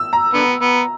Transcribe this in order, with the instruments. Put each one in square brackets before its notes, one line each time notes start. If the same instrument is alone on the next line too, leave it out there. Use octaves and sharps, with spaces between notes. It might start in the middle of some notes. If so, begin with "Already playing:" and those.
Already playing: [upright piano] E6
A#5
[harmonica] D3 B3
B3